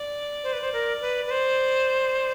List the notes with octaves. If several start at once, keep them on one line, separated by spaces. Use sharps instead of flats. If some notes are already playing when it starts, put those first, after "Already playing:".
Already playing: D5
C5
B4
C5
A#4
B4
B4
C5